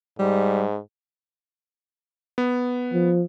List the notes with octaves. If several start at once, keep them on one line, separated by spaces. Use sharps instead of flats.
G#2 G3
B3
F3